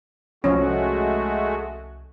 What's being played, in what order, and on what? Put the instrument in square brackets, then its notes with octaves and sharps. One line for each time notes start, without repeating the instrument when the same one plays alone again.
[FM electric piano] C2 [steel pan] F3 C#4 [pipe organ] G#3 A3 F#4